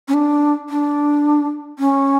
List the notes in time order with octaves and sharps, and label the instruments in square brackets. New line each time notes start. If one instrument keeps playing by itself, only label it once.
[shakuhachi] C#4
D4
D4
C#4